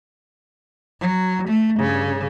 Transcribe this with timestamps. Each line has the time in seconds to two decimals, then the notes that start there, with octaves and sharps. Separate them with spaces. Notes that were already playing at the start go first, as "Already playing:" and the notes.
1.00 F#3
1.48 A3
1.78 G2 C#3